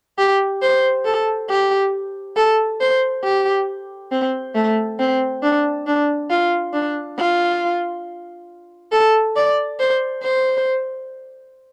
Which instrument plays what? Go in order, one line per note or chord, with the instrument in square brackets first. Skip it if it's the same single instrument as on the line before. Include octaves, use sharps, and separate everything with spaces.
[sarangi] G4
C5
A4
G4
A4
C5
G4
C4
A3
C4
D4
D4
F4
D4
F4
A4
D5
C5
C5